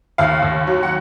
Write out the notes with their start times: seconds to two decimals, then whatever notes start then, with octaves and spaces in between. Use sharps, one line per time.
0.18 D#2 F5
0.42 D#2
0.67 F#3
0.83 F#5